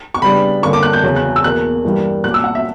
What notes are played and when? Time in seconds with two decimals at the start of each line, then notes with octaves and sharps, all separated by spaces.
0.14 C#6
0.22 C#3 G3 B3 D4 B5
0.63 G2 D3 A#3 C#4 C#6
0.73 D6
0.83 F#6
0.93 G6
1.03 E2 C#3 F#3 C#4
1.16 F#6
1.36 E6
1.44 E2 B2 A#3 F#6
1.85 G2 E3 G3 A#3
2.24 A#2 F#3 C#4 F#6
2.31 D6
2.34 E6
2.44 F#5
2.55 E5